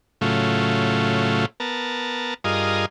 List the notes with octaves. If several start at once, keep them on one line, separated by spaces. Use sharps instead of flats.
A2 C#3 F#3 A3 F4
B3 A#4 A5
G2 F4 G#4 A#4 D#5